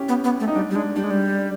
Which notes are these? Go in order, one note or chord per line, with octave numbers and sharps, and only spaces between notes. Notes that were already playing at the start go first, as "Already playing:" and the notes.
Already playing: C#4 E4 G4
B3
B3
A3
D#4
G3 D4
G3
G#3 D4
G3 D4
G#3
G3